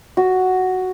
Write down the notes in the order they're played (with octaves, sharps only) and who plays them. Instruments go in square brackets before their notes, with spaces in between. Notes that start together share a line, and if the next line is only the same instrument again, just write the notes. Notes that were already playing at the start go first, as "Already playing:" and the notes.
[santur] F#4